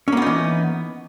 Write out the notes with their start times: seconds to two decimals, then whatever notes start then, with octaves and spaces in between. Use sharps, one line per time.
0.08 C#4
0.12 A#3
0.17 B3
0.22 D#4
0.27 E3